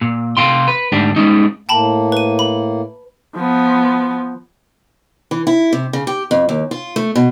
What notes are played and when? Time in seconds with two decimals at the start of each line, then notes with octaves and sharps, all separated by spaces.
0.01 A#2
0.37 C3 B3 F5 G5 C6
0.68 B4
0.92 D2 G#2 D4 G4
1.16 G3 G#3 C#4 D#4
1.69 A2 A#3 G5 A5 B5
2.12 B4 D#7
2.39 B5
3.36 F3 B3
5.31 E3
5.47 E4
5.73 C3
5.93 C#3
6.07 G4
6.31 F2
6.49 D#2
6.71 F4
6.96 A3
7.15 B2